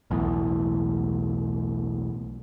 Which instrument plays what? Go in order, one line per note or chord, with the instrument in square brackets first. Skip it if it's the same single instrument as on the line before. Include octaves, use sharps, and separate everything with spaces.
[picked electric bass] B1 E2 A2